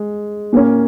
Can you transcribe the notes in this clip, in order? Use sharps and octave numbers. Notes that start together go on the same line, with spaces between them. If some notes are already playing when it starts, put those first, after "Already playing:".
Already playing: G#3
A#2 A#3 C#4